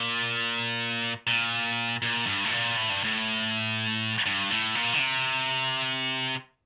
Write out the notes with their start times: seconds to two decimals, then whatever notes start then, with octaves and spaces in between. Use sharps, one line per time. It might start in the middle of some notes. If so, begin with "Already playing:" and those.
Already playing: A#2
1.27 A#2
2.02 A#2
2.27 G2
2.44 A2
2.52 A#2
2.76 A2
2.90 G2
3.04 A2
4.26 G2
4.51 A2
4.75 A#2
4.93 D3
4.99 C3